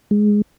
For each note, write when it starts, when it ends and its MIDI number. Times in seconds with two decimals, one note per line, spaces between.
0.11 0.42 56